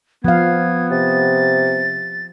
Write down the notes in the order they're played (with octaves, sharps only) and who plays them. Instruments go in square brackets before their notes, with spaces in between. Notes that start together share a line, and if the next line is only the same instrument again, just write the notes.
[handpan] F3 F5 [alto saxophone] B3 [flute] G#6
[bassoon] C3 [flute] A6